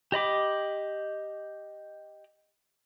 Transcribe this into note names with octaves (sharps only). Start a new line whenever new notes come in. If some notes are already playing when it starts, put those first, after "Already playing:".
G4 D#5 B5 D6